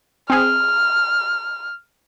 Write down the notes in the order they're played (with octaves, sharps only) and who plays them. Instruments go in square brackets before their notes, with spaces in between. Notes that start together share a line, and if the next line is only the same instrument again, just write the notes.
[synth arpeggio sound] C4 G#4 [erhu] F6